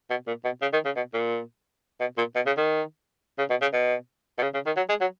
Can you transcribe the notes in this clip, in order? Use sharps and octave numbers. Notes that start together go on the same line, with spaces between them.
B2
A#2
B2
C#3
D#3
C#3
B2
A#2
B2
A#2
B2
C#3
D#3
C#3
B2
C#3
B2
B2
C#3
C#3
D#3
F#3
G#3
F#3